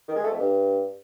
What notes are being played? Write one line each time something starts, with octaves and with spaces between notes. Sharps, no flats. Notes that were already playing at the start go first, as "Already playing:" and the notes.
D#3
G#3
A3
F2
G2